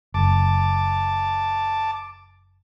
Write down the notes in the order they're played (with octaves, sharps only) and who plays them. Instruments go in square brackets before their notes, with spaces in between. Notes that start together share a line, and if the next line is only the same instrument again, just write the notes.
[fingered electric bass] F#1 [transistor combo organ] A5 D6